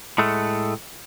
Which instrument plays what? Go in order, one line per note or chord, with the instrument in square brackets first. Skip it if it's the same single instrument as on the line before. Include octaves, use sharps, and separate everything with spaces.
[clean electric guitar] A2 G#3 A3